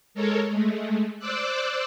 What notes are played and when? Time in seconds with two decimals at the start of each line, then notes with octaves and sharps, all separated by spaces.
0.14 G#3 A4 A#4 C#5
0.49 G#3 A3
1.19 C5 D5 D6 E6 F#6